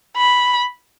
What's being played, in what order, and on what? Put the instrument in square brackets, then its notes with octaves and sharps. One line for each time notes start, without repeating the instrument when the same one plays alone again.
[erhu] B5